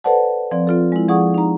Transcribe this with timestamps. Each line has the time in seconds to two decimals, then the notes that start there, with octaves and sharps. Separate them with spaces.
0.04 A4 B4 C5 D5 F#5 A5
0.51 F3 C4 D5
0.67 C4 F4 A4
0.92 G#3 E4
1.09 F3 G#4 D5 F#5 C#6 D#6
1.34 D#4 A#5